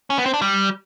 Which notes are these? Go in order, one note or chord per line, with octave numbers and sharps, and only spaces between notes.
C#4
B3
C4
D4
G3